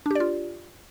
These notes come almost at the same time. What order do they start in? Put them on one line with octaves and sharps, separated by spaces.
D4 G4 D5 F4